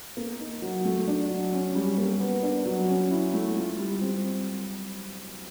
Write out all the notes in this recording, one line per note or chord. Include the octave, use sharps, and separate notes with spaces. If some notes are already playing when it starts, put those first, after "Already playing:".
A#3
D#4
F#3
A3
D4
F#3
C#4
G3
A#3
B3
D4
F#3
C#4
E4
A3
F4
G3
C4